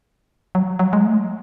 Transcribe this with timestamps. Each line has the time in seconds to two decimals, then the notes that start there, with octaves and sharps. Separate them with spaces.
0.55 F#3
0.79 F#3
0.93 G#3
1.06 A3